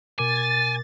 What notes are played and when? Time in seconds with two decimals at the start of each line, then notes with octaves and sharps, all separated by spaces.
0.19 B2 A#4 G#5 D6 A6